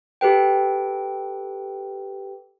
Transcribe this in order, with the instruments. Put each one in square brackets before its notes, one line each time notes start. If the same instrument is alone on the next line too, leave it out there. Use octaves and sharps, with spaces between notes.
[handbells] G4 A4 B4 G5